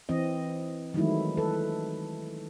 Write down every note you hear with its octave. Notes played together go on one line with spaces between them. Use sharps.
E3 C4 D#5
D#3 E3 F#3 G#3 A3 E4
A4 B4